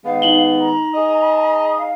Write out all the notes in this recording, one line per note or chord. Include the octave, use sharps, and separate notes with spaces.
D#3 G#3 B3 F5
D#4 F#7 G7
A#5
G#4 D#5
F5